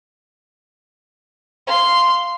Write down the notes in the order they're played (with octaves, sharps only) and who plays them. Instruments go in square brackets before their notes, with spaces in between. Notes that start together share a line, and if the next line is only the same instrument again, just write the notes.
[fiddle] F5 C6